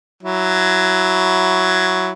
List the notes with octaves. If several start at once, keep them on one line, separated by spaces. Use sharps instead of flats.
F#3 E4